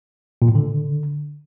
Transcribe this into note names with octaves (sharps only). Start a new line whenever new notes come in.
A#2
A2
D3